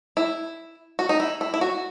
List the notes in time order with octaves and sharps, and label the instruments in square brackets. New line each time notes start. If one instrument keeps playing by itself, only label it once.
[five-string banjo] E4
F#4
D#4
E4
E4
E4
F#4